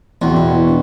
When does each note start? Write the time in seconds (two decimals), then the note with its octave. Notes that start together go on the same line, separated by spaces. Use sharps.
0.22 E2 C4 E4 F#4
0.36 B2
0.68 D4